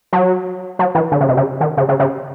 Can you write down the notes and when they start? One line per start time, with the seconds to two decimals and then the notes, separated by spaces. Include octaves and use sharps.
0.13 F#3
0.79 F#3
0.95 E3
1.12 D3
1.20 C#3
1.28 C3
1.37 C#3
1.61 D#3
1.77 C#3
1.89 C#3
2.00 C#3